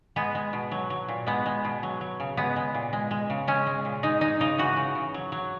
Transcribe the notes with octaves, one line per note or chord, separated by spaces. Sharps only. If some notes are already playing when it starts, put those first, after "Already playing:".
G#3 B3
G#3
B2
F#3
F#3
A#2
G#3 B3
G#3
B2
F#3
F#3
C#3
G#3 B3
G#3
A#2
G#3
G#3
C#3
G#3 C#4
G#3
A#2
G#3 D#4
G#3 D#4
C#3 D#4
E3 F#4
C#3
C#3
F#3
F#3